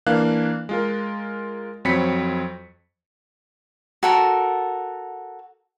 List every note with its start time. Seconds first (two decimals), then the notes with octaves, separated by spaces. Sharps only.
0.06 E3 A#3 D4 F5 F#6
0.69 G#3 F4 A#4
1.85 F2 F#3 C4 B5 B6 C#7
4.03 F#4 A4 A#4